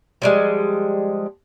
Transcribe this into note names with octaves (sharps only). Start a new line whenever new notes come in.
F3 G3 G#3